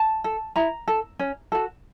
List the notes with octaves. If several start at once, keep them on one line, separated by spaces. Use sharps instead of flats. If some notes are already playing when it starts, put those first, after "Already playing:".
Already playing: A5
A4
E4 A#5
A4
C#4
F#4 A4